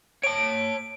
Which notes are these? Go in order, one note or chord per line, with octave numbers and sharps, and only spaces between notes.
C#5 A5 D7